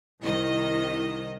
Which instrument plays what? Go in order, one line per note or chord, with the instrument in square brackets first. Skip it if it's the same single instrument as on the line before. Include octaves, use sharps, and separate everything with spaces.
[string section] C2 D#3 D#5 [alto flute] E4